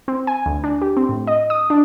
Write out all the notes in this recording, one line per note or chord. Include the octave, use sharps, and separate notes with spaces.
C4
G#5
D2
D4
G4
C4
A2
D#5
D#6
D4